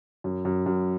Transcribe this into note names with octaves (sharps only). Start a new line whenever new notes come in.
F#2
F#2
F#2